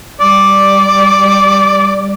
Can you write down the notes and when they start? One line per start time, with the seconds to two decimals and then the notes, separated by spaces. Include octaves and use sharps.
0.20 G3 D5